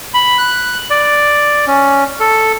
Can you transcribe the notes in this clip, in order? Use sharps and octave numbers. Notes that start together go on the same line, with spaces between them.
B5
F#6
D5
C#4
A4